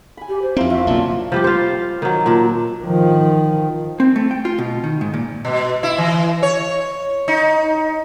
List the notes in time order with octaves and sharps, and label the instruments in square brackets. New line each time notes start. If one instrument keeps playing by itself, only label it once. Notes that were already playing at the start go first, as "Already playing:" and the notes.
[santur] G#5 B5
[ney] G4
C5
[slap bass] F2 C4 [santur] E4 F4 A#4
[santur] F4 F#4 [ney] E5
[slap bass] B1 C#3 F3 [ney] A#3 [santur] D4 A5
[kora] F3 G3 G4
F4 C5
D#3 F#3
A#2 D4
[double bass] D#3 F3
[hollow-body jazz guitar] C4
A3
G5
F4
B2
D#3
G#2
A#2
[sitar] B2
E4
E3
C#5
D#4